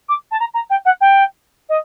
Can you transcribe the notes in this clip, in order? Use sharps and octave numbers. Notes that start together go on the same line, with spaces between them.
D6
A5
A#5
A#5
G5
F#5
G5
D#5